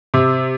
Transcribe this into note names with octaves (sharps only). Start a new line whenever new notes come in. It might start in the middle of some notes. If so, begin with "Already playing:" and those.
C3